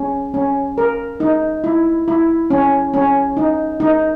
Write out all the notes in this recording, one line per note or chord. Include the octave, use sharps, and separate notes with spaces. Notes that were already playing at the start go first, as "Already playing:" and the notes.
Already playing: C#4
C#4
A#4
D#4
E4
E4
C#4
C#4
D#4
D#4